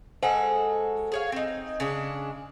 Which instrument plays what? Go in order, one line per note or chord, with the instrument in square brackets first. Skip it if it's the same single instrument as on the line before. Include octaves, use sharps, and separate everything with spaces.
[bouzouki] G#3 F#4 A4 [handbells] C5 F#5 G#5
[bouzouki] G#4 C#5 F5
C4 D#4
C#3 G#3 D4